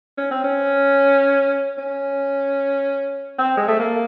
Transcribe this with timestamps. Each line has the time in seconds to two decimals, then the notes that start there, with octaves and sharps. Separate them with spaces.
0.18 C#4
0.31 C4
0.44 C#4
1.78 C#4
3.39 C4
3.57 G#3
3.68 A3
3.80 A#3